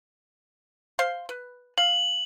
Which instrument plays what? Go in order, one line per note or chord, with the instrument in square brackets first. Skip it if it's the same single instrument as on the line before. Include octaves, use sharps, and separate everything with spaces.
[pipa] C5 F5 C6
B4
[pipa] F5 [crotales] F#7